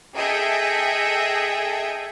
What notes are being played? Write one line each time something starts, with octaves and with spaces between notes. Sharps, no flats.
G#4 A4 D#5 E5 G5